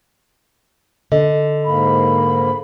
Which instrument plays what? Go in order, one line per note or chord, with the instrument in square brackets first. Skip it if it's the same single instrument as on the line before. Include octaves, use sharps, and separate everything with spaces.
[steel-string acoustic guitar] D3 [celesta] D#5
[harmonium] G#2 A#3 [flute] B5